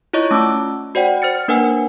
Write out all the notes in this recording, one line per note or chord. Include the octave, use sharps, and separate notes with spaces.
E4 F4 C#5 D#5 C#6
A3 C#4 A5 D6 E6
F#4 C5 D5 F#5 G5
C5 F6 A6 C#7
A#3 D4 A#4 B4 F#5 G#5